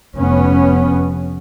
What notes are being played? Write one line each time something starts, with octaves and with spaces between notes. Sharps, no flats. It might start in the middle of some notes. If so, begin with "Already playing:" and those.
F1 B3 C#4